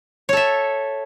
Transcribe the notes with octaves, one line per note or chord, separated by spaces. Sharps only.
A4 C#5 E5